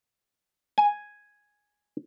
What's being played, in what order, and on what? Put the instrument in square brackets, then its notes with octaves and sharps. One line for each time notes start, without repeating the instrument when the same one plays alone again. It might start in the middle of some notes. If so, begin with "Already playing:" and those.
[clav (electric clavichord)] G#5